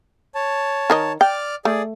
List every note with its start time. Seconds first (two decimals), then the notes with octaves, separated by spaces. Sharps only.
0.35 C#5 A5
0.90 D#3 A#4 D#5
1.21 D5 G5 D6 F6
1.65 A3 G#4 D5